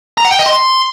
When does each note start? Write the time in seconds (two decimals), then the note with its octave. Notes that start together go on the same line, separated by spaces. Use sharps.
0.18 A#5
0.25 F#5
0.32 G5
0.39 D#5
0.46 C6